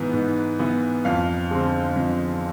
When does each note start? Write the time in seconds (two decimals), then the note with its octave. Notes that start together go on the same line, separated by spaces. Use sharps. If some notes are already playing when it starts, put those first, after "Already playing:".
Already playing: G#2 E3 B3
0.13 G#2
0.59 E3 B3
1.05 F2 F5
1.51 D3 G#3 C4
1.96 F2